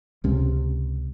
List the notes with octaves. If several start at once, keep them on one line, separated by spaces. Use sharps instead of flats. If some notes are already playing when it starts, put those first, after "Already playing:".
C#2 C3 C#4